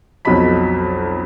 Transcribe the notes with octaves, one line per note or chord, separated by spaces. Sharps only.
B1 F2 F#3 D#5 B5 B6